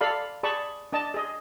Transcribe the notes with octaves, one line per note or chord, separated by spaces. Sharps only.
A4 D5 F5 B5
G#4 D5 A5 B5 C#6
D4 D#5 A5
G#4 D#5